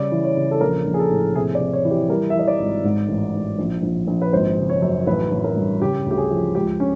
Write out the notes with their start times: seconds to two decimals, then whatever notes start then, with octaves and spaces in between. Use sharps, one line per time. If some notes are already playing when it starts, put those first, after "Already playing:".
Already playing: C#3 G3 D5
0.12 E3
0.24 C#5
0.37 C#3
0.51 A4
0.61 A#1 A#4
0.86 A#1
0.94 G#4
0.99 A4
1.11 A2
1.35 C3 G#4
1.55 D5
1.60 C3
1.73 C#5
1.85 E3
1.91 G4
2.09 G3 A#4
2.30 E5
2.34 E3 D#5
2.48 D5
2.59 G#1
2.84 G#2
3.09 A1
3.34 G#2
3.59 A#1
3.83 A#1
4.07 A#1
4.22 B4
4.33 G#1 C5
4.58 C#3
4.70 C#5
4.82 F#2
5.07 A1 B4
5.31 A1
5.44 A#4
5.56 G2
5.81 C#3 G4
6.06 D2 G4
6.18 G#4
6.31 F3
6.55 C#2 G4
6.80 C#4